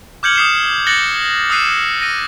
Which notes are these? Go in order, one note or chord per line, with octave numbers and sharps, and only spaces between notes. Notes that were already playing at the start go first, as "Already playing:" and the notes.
D6 F6 G6 G#6 C#7 F#7
D#6 C7 E7
F#6 A6 A#6 C#7 F#7 G7
D#6 E6 F#6 C7 D#7 E7
A#6 D#7